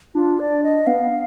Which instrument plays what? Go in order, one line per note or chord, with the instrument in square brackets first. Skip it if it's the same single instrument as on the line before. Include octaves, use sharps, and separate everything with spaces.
[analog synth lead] D4 [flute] F4
[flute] D5
D#5
[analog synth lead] B3 [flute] F5